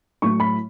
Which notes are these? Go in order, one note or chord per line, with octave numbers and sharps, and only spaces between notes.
A2 F#3 A3 C#6
B5